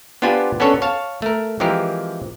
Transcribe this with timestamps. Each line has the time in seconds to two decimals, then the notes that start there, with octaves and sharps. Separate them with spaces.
0.22 B3 D4 F4 G4 C5 G#5
0.60 B3 C#4 D4 A4 C#5
0.82 C#5 F5 A5
1.22 A3 A#4
1.60 E3 F3 G#3 C4 G4 A#4